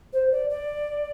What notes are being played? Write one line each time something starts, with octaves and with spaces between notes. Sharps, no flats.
C5
D5
D5